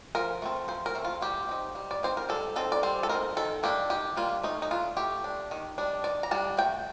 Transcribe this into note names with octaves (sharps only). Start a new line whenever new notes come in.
F3 A#4
A3 C4
F3 C5
A#4
A3 C4
F4
G3 G4
C4 D#4
G3
D5
C4 D#4 C5
A#4
G3 A4
C4 D#4 A4
D5
G3 C5
A4
C4 D#4 A#4
D#3 A4
G3 A#3 D4 G4
D#3 G4
G3 A#3 D4 F4
A3 D#4
D#4
D4 F4
A3 G4
D4
D#3
G3 D4
D#3 D5
A#5
G3 D4 A5
A3 G5